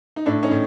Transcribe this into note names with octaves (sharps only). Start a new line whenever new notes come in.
D#4
A2 D4 E4
C#4 D#4
A2